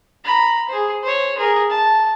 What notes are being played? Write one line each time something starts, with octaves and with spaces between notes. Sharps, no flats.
A#5 B5
G#4 C5
C5 C#5
G#4 A#4
A5